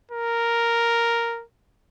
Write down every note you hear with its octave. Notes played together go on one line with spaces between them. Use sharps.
A#4